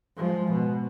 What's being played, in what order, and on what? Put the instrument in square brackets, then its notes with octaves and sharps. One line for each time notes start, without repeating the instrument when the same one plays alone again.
[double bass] F3 G#3
B2